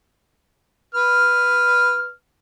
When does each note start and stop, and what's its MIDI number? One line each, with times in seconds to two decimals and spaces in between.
0.95 2.10 71
0.95 2.10 89